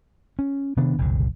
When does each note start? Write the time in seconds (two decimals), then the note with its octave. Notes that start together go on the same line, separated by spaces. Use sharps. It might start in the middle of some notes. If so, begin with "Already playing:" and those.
0.39 C#4
0.77 C3 D#3 B3 D4
0.98 F#1 C2 A#2 D3